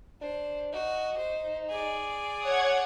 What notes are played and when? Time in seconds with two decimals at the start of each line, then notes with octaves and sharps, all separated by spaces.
0.21 D4 C5
0.73 D#4 F#4
1.17 C5
1.69 G#4 D5
2.41 C#5 F#5 D#6 G#6